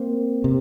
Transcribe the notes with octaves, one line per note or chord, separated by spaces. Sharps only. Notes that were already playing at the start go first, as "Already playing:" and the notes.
Already playing: A#3 C4
C3